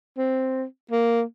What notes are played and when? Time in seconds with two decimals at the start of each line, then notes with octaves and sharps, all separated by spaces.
0.18 C4
0.91 A#3